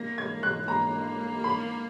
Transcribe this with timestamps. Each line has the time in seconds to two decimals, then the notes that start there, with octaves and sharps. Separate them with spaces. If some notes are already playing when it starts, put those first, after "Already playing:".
Already playing: A#3 A#6
0.18 G#6
0.43 F#6
0.68 A#3 A#5
1.44 B5